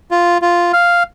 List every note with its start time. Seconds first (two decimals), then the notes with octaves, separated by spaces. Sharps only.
0.11 F4
0.42 F4
0.73 F5